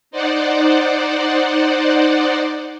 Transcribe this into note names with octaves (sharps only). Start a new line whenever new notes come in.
D#4 C5 D5 F#5